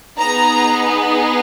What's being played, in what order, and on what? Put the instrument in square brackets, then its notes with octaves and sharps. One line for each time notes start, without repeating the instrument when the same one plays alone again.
[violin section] B3 D#4 G#4 A#5